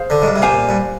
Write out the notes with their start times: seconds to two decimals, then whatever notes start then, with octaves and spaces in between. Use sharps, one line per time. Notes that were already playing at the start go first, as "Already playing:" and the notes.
Already playing: G#4 C5 F5
0.10 D3
0.22 G#2
0.27 G2
0.36 C3
0.42 A#2 G4 C5 F5 G#5
0.69 G2